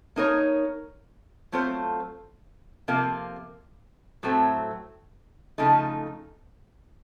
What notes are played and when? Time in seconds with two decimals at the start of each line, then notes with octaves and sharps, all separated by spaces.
0.16 A#3 D#4 A#4 C#5
1.52 F#3 A3 C4 F4 C5
2.88 C3 F3 A#3 F4
4.23 A2 F#3 A3 C4
5.58 C#3 F3 A3 D#4